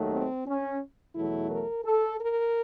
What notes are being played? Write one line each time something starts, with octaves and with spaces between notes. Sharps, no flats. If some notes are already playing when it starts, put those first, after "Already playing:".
Already playing: D#2 D#3 F#3 A3
C4
C#4
E2 B2 F#3 A3 E4
A#4
A4
A#4